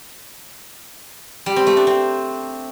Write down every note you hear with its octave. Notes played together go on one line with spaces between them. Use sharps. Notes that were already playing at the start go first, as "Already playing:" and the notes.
G3
C4
A3
D4
C4